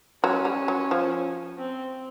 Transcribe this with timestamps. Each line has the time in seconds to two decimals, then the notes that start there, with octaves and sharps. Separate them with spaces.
0.23 F#3 C#4
0.45 G3
0.68 F#3
0.91 F3
1.58 C4